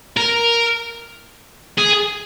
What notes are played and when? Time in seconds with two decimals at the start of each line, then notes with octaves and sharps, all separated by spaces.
0.17 A#4
1.78 G#4